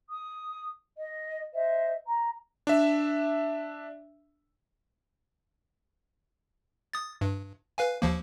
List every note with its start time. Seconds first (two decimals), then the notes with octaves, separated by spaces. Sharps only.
0.08 D#6
0.98 D#5
1.53 C5 D#5 E5
2.05 A#5
2.67 D4 E5
6.93 D#6 A6
7.21 G2
7.78 B4 F5 G#5
8.02 D#2 F3 A#3